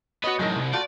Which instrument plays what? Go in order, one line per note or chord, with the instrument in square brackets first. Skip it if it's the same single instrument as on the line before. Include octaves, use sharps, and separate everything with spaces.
[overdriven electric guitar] B3 B4 [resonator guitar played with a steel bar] F#4 C#5 D#5
[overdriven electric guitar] F#2 A2 [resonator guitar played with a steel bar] G#3 D#4 A#4
[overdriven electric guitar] C2
[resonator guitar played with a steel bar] A3 F4 F#4 [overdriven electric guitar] D5